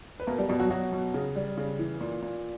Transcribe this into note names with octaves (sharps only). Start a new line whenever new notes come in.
B4
B2 A#3 A#4
G3 G4
B2 G3 G4
F#3 F#4
B2 F#3 F#4
B2
C#3
G3
C#3
E3
A#2
A#2